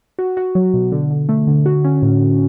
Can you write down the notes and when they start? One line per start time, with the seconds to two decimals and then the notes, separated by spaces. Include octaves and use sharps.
0.19 F#4
0.37 F#4
0.55 F#3
0.74 B2
0.92 D3
1.11 D3
1.29 A3
1.47 D3
1.66 F#4
1.84 C#4
2.02 A2
2.21 A2